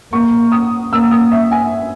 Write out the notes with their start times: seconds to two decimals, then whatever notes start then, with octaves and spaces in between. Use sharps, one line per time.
0.13 A#3 C#6
0.52 D#6
0.92 A#3 E6
1.11 D#6
1.32 E5
1.51 G#5